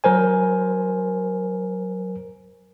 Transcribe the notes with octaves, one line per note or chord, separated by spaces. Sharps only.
F#3 A#4 C5 G#5